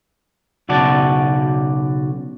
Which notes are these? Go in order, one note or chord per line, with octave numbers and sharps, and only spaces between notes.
B1 C#3 F#4 D5 A5